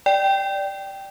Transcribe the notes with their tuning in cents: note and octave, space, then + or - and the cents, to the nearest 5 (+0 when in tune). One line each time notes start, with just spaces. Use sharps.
D5 +0 G5 +0